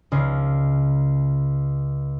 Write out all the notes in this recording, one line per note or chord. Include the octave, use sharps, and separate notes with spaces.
C#2 C#3